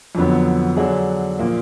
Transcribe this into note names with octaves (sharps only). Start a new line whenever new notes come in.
F2 D3 F#3 B3
D3 F#3 D4 G#4
A#2 F3 A#3